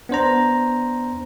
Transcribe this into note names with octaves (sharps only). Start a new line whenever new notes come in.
B3 D4 C5 A#5